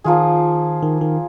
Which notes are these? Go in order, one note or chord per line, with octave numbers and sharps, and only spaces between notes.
D#3 F3 A#3 F4 G#4
D#3
D#3